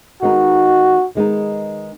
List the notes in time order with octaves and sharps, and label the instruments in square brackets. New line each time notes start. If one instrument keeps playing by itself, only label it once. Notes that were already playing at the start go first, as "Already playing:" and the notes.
[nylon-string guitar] D#3 G#3 B3 D#4 [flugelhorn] F#4
[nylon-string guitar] D#3 G#3 B3 D#4